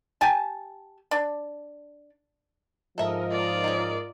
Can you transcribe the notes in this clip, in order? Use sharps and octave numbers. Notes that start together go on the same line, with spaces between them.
G4 G#5 A5
D4
G#2 F3 A4 A#4 D#5 E5 A#5
F4 D5
C#4 D#4